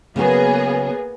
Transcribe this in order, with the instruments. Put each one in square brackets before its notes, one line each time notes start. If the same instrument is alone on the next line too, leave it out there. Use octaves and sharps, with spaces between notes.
[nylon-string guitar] C#3 F#3 F#4 [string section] A#3 B3 G#4